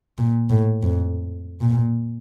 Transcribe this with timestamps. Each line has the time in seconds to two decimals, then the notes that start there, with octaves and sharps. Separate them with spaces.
0.18 A#2
0.50 A2
0.83 F2
1.61 A#2